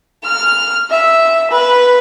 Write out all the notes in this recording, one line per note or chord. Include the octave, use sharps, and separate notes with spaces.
F6
E5
B4